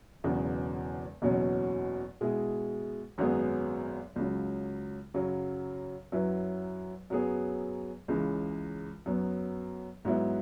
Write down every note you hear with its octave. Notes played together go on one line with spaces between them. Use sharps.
E1 E2 C#3 F#3 B3
F#1 E2 B2 F#3 C#4
B2 G#3 E4 G#4
G#1 F#2 F#3 B3 G#4
C#2 C#3 F#3
F#2 C#3 F#3
F#2 F#3 E4 B4
F#2 F#3 B3 G#4
C#2 C#3 E3 G#3
F#2 F#3 B3
G#2 F#3 B3 E4